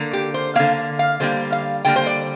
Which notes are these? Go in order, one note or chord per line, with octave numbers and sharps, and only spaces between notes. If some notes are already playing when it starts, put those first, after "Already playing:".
Already playing: D3 A#3
G4
C5
D3 A#3 F5
F5
D3 G3 A#3 C5
F5
D3 G3 A#3 G5
C5
D5